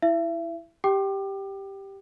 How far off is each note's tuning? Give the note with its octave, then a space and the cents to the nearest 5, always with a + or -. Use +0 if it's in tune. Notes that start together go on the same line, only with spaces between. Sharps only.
E4 +0 E5 +35
G4 +0 G5 -15 D6 +30